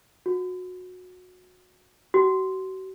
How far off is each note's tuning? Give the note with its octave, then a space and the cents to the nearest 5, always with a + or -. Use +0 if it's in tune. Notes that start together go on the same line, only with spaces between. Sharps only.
F#4 -25
F#4 +40